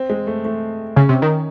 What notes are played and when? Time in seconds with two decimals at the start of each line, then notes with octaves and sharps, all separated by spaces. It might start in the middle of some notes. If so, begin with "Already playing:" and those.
Already playing: C4
0.10 G#3
0.27 A3
0.45 A3
0.96 C#3 C#4
1.09 C3
1.22 D#3